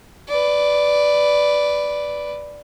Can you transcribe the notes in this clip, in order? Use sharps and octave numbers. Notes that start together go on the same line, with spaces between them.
B4 D5